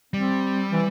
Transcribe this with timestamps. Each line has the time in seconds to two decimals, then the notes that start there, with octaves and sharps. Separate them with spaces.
0.14 G3 C4
0.70 E3